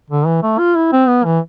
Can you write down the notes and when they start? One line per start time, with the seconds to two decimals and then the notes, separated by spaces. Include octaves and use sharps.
0.10 D3
0.26 E3
0.43 A3
0.58 F4
0.75 E4
0.92 C4
1.08 B3
1.24 E3